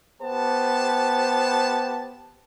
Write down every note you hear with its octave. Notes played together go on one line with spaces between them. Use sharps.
B3 G4 C5 A5